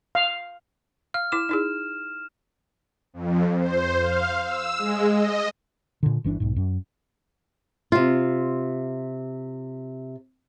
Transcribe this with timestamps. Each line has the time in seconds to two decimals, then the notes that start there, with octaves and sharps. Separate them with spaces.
0.15 F5
1.14 F5 F6
1.32 E4 D6 E7
1.49 D#4 E4 G#4
3.13 F2
3.59 C5
4.00 F5
4.44 E6
4.78 G#3
5.11 D#5
6.03 A#2 D3
6.24 G1 E3 C4 D4
6.40 B1 G#2
6.56 F#2
7.92 C3 F4